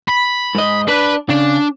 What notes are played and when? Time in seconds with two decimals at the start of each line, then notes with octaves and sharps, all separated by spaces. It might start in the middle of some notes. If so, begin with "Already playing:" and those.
0.09 B5
0.55 G#2 D#5
0.88 D4 B4
1.29 C#3 D4